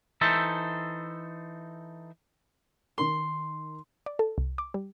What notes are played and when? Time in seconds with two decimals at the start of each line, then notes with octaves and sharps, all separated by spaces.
0.21 E3 D#4 A4 C5 E5
2.98 D#3 D#4 A#4 C6
4.06 D5
4.19 A4
4.38 C2
4.58 D6
4.74 G3